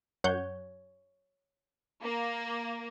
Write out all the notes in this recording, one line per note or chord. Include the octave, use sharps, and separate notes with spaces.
F#2 C#5 F#5 G6
A#3